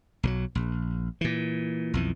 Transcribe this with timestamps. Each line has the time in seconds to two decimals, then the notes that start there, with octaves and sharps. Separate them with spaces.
0.23 B1 E3 F#3
0.55 A#1
1.21 A#2 E3
1.94 B1 F2 E3